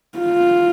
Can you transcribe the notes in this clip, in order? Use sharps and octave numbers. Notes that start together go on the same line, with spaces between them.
F4